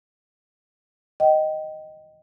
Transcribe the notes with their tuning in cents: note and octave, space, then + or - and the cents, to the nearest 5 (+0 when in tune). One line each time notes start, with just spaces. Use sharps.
D#5 +0 G5 -25